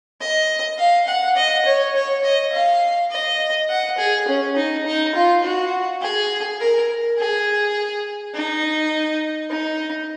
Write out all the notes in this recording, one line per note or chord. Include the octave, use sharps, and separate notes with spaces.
D#5
F5
F#5
D#5
C#5
C#5
D#5
F5
D#5
F#5
G#4
C#4
D#4
D#4
F4
F#4
G#4
A#4
G#4
D#4
D#4